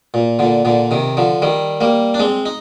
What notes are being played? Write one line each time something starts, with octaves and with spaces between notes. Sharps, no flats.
A#2
A#2 D3
A#2 D3
C3 D#3
D3 F3
D#3 G3
G3 A#3
D4
G#3 C4
D#4